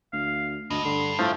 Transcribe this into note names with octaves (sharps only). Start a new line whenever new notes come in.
D2 F5
D2 G2 D#5
D3 C6
A2 F3 A3